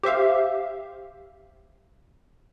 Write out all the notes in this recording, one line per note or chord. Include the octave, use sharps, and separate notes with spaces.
G4 C5 E5 F5